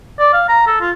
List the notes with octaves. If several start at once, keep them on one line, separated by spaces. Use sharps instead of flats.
D5
F5
A#5
A4
F4